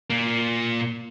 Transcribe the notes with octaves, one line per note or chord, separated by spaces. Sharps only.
A#2 A#3